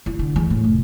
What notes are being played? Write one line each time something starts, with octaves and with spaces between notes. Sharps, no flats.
E4
D3
E2
A2
F1